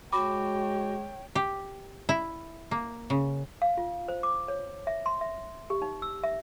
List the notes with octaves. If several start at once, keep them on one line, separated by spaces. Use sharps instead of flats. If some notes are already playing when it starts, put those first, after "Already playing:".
G#3 F#4 C#5 G5 B5 D6
G4
E4
A#3
C#3
F5
F4
C5
D6
C#5
E5
C6
E5
G4
D#4
E6
E5